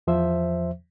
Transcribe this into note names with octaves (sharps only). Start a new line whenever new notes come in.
E2 F3 C5 E5